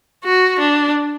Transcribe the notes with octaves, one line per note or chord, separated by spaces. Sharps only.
F#4
D4